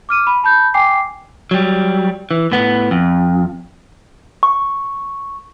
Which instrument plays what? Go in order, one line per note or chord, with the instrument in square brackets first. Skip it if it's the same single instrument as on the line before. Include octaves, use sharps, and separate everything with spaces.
[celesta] D6 F6 D#7
B5
A5 B5 G6
G5 G#5 D6 C7
[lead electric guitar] F#3 G3
E3
A2 B3
F2
[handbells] C#6